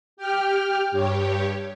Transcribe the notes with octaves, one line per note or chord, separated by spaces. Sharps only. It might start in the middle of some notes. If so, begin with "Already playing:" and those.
G4 G5 F6
G2 G4 C#5